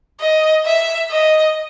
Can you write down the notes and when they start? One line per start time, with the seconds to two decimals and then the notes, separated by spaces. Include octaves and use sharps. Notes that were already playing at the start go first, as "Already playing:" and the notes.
0.20 D#5
0.65 E5
1.10 D#5